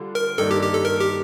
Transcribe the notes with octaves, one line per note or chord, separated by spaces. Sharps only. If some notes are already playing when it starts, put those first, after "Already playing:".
Already playing: D3 G3 D4 F4
A#4
G2 D#3 A#3 D4 A4
G4
G4
A4
A#4
G4